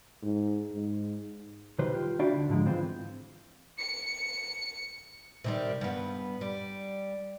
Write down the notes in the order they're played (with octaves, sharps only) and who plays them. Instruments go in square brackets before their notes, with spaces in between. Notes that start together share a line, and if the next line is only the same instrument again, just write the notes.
[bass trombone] G#2
G#2
[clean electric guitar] B1 D#3 G3 B4 C5
F4 G4
D4 E4 F#4 D5 F5 G5
D2 D3
G#2 D3 F3 G#3
E3 C4 F4
[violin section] C#7
[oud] C3 D#3 G3
G2 B3
G3